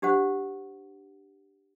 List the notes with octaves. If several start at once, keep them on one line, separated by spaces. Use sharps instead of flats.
D4 G4 C5 F#5